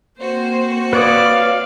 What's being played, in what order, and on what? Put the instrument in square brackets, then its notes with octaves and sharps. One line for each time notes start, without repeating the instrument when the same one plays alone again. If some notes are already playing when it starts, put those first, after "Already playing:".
[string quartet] A#3 C4 F#4 [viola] C5
[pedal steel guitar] B4 C#5 D#6 [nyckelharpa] D5 [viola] F5